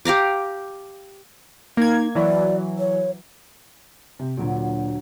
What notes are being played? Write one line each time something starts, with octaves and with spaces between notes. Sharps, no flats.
G4 F5 A#5 D6
A#3 D#4 G#6
E3 F#3 D5
C#5
C3
D2 A#2 F#3 D7